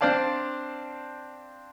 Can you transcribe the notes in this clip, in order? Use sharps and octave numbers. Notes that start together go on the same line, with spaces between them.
C4 D4 C5 D5 F5 A5